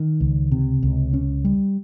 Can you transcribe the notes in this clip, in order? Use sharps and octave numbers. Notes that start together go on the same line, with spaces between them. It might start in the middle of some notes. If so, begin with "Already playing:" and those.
Already playing: D#3
C#2
C3
C#2
C#4
G3